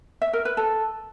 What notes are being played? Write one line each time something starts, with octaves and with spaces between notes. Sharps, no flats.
E5
A#4
B4
A4